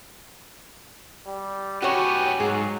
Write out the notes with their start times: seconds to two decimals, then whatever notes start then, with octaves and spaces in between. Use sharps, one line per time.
1.27 G3
1.82 B3 C#4 F#4 G4 C#5
2.40 G#2 F#3 G#4